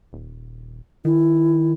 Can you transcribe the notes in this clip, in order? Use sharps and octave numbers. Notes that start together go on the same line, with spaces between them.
D#1
D#3 E4